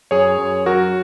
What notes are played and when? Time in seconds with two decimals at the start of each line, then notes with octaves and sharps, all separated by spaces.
0.11 F#2 G#4 C#5
0.38 F#2
0.66 F#3 F#4 A#4